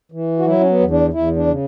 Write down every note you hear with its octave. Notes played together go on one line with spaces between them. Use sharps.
E3
F#4
F#3 E4
C#4
B3
E2
D4
E2 E4
D4
C#3